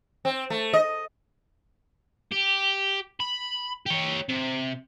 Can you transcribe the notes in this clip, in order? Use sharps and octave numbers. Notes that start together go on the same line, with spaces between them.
C4
A3
D#5
G4
B5
G4 C#5
C3